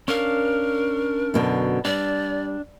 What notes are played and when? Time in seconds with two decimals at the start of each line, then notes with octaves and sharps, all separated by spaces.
0.08 C#4 D4 A#4 F5
1.34 F#2 B2 D3
1.85 G3 D4 D5